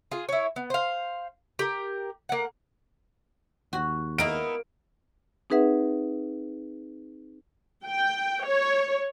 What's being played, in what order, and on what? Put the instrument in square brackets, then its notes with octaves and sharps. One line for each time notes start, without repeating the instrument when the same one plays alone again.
[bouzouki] F4 G#4
E4 C#5
B3
C5 F5
G4 A#4
A#3 F#5
[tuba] D#2 [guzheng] F#4
[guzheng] A#3 A#4 [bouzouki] B3 D#4 E4 [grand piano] D7
[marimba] C4 D#4 G#4 B4 E5 F#5
[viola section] G5
C#5